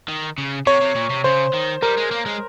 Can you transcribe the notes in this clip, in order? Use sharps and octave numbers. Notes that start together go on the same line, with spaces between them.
D#3
C#3
C3 C#5
C3
A#2
C3
C#3 C5
D#3
G3 A#4
G#3
A#3
G#3